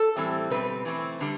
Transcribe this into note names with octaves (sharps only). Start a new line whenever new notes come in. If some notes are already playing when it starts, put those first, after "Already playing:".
Already playing: A4
A2 E3 G3 C4
B2 G3 C4 B4
E3 A3 C4
D3 G3